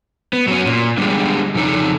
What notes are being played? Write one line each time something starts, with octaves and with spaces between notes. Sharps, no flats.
B3
F#3 C#4
A#2
D3 G3 G#3
F2 C#3 D#4 A4